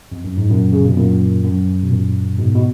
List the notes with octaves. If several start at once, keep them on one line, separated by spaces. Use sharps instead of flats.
F2
F#2
G#2
F#2 A#2
C#3
B2
F#2 A#2
F#2
B2
F#2 A#2
G#2 B2
B2